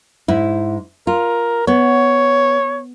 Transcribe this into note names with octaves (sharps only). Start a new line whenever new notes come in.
G#2 E4
F4 A#4
B3 C#5